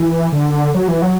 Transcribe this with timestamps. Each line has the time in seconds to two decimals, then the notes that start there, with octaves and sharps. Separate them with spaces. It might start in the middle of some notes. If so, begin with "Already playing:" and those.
Already playing: E3
0.32 D3
0.74 F#3
0.88 E3
1.02 F#3